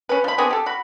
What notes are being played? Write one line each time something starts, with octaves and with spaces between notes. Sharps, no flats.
C#4 B4
F3 B5
B3 C4 D4 G#4
G4 A4
F#4 B5